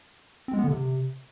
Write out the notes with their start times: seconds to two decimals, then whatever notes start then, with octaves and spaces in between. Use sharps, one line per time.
0.48 C4
0.53 G#3
0.59 B3
0.64 D3
0.69 C3